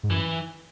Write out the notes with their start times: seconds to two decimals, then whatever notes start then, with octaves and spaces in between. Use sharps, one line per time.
0.03 G#2
0.10 F#2 E3